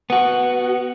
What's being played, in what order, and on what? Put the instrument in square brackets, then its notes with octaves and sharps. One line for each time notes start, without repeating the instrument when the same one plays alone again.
[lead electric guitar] B3 F#4